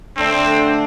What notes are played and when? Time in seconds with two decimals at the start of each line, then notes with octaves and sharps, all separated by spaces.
0.17 D3 A3 C4 D4